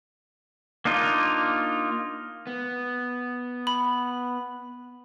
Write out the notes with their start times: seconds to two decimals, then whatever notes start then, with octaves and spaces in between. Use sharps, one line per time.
0.85 A#3 D4 D#4 F4
2.47 B3
3.67 B5